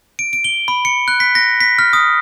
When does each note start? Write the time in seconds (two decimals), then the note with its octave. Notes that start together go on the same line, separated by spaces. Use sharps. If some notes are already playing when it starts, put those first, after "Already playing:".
0.19 D7
0.33 D7
0.44 G7
0.68 B5
0.85 C#7
1.08 F#6
1.20 B6
1.35 A#6
1.61 B6
1.79 F6
1.93 D#6